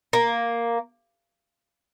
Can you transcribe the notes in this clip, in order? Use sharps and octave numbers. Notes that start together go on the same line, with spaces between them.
A#3